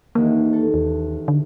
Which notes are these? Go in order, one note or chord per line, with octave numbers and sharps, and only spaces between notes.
E1 D#2 A#3
A4
D#2
D3